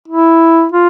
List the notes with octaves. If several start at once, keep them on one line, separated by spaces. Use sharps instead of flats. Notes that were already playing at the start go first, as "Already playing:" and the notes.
E4
F4